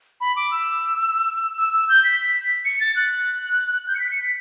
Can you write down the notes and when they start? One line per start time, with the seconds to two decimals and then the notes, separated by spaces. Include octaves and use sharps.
0.21 B5
0.36 D6
0.51 E6
1.58 E6
1.74 E6
1.89 G6
2.04 B6
2.65 C#7
2.81 A6
2.96 F#6
3.84 F#6
3.88 G6
3.95 C#7
4.00 B6
4.11 C#7
4.22 B6